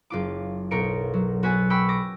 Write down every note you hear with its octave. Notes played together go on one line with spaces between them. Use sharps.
F#1 F4 D6
B1 B2 A#4 C#7 D7
F#3
B3 F#4 B4 E5 G#5
G5 B5 C#6 D6 E6
D6 A#6